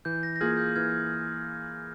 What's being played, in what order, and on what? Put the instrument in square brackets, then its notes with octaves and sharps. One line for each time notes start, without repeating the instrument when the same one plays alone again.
[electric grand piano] E3 [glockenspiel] G6
[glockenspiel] G6 A#6
A#6
[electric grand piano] A#3 F4 G#4 [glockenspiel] F6 G#6
[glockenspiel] G6
[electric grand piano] E3 [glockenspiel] F6 G#6
[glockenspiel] G#6